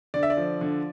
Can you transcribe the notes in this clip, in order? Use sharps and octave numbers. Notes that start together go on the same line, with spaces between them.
D3 D5
E5
D5
F3
D3